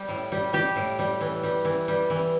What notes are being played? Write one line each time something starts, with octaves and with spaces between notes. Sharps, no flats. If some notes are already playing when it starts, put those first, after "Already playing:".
Already playing: G3
A2
G3
G3 G4
A2
G3
E3
G3
E3
G3
E3